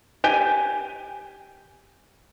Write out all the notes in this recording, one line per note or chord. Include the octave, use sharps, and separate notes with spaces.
G4 G5 G#5